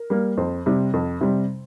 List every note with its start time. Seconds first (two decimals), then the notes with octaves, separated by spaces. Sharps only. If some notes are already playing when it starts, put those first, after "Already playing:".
Already playing: A#4
0.10 G3 A#3
0.37 F2 C5
0.66 C3 G3
0.93 F2
1.21 C3 G3